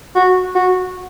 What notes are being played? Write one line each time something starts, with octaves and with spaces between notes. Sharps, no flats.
F#4
F#4